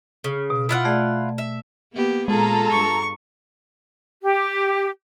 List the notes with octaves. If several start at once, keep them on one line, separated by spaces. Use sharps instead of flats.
C#3
B2
E4 F4 F#5
A3 G#4 D5
E5
A#3 B3 G4
A#2 G#3 F4 G#4 A4 A#5
G2 C#6
G4